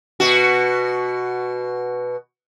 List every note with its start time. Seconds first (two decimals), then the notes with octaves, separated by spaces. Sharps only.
0.20 B2 F#4